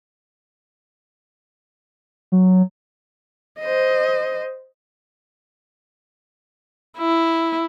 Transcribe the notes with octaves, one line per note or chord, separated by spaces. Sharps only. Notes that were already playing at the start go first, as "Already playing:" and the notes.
F#3
C5 D#5
E4